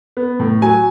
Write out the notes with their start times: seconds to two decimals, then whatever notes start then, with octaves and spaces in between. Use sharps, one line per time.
0.17 B3
0.40 A2
0.62 F#3 G#5